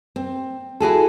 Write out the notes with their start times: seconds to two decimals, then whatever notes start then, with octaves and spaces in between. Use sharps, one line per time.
0.16 C4
0.80 E4 F#4 G#4 A4